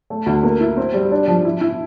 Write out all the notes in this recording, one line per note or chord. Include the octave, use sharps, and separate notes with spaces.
A3
D2
A#3
E4
C4
G3
D4
F3
E4
E4